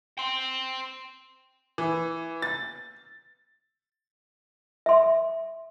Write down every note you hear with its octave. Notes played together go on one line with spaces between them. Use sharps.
G5 C6
E3
A6
E5 C6